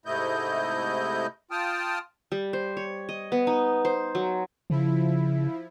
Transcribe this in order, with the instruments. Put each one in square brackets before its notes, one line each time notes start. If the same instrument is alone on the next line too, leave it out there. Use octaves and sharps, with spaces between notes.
[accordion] G#2 C3 A3 E4 D#5 G6
F4 G5 A5 D#6 F6
[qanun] G3
C5
C#5
D#5
B3
D#4
C5
F#3
[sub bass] C#3 [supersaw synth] F3 E4